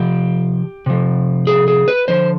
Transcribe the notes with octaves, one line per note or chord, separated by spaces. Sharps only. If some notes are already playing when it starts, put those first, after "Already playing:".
Already playing: C3 F3 G4
C3 F3
G#4
G#4
B4
D3 F3 C5